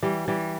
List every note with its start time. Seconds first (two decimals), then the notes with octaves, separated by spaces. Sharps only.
0.03 E3 G3
0.28 E3 G3